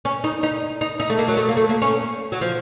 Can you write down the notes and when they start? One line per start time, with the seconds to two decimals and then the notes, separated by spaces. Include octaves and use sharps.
0.05 C#4
0.24 D#4
0.43 D#4
0.81 D#4
1.00 D#4
1.10 A3
1.19 A#3
1.28 F#3
1.37 A3
1.48 A#3
1.57 A3
1.69 A#3
1.82 C#4
2.32 F#3
2.41 F3